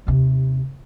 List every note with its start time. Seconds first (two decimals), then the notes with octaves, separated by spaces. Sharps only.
0.07 D#2 C3